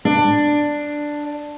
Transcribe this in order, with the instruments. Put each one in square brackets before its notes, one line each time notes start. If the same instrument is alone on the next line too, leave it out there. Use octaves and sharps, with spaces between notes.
[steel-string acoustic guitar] D4